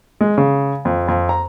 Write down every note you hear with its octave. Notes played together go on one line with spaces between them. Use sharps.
G#3
C#3
F2
F2
A#5